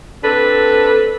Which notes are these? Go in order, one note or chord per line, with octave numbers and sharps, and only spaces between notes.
C4 D4 A4 B4